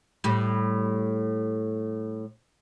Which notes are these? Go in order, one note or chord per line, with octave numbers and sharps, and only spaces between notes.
A2 G3